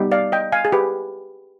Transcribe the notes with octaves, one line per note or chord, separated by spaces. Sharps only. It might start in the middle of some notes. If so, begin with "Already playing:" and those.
Already playing: G3 B3 D#4 G4
D5 F5
D#5 G5
F5 G#5
G#4
G4 B4